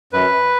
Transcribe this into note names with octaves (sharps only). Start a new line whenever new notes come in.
F#2 B4